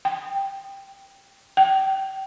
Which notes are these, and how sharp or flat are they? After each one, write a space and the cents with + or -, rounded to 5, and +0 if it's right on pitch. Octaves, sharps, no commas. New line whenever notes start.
G5 +5
G5 -30